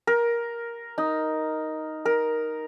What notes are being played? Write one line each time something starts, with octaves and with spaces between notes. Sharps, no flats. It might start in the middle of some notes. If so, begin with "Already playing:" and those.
A#4
D#4
A#4